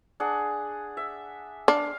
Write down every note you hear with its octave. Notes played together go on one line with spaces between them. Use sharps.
D4 G#4 F#5
E5
D4 F5